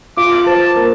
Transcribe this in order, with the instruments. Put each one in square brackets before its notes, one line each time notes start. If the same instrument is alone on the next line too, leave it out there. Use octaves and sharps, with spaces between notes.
[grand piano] F4 [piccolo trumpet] D6
[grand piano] C5 [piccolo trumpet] A5
[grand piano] A#3